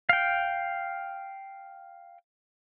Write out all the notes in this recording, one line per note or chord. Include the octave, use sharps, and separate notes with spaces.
F5 G5